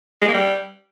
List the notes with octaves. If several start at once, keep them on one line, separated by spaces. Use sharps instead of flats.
G#3
A#3
G3